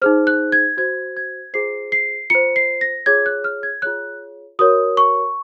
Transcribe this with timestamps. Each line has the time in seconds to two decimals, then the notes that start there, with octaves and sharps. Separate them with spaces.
0.02 D#4 G#4 C5 F6
0.27 F#6
0.52 G#6
0.77 F#4 C5 G#6
1.17 G#6
1.53 F4 G#4 C5 C7
1.92 C7
2.30 F4 C5 C#7
2.56 C7
2.81 A#6
3.06 F4 G#4 C#5 G#6
3.26 F#6
3.44 F6
3.63 G#6
3.82 F4 G#4 C#5 F#6
4.59 F#4 A#4 C#5 D#6
4.97 C#6